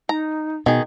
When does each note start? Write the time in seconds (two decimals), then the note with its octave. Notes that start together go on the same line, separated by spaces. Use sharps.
0.09 D#4 A#5
0.66 B2 D#3 G#4